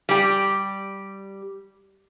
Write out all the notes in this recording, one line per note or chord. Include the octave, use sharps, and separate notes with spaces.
G3 G4